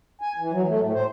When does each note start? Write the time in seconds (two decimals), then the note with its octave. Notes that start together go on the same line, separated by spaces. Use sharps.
0.21 G#5
0.38 E3
0.52 F#3
0.68 A3
0.81 A2
0.94 C5